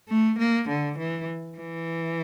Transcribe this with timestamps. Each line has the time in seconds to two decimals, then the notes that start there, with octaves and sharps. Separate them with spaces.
0.08 A3
0.39 A#3
0.69 D3
0.98 E3
1.58 E3